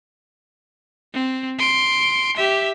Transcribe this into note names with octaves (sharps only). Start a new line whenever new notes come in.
C4
C6 D7
G4 E5